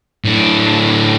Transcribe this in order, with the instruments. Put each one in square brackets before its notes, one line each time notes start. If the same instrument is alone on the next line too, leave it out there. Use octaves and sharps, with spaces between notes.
[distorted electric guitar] A2 D4